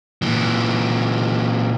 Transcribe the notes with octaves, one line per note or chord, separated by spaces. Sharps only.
A#2 E3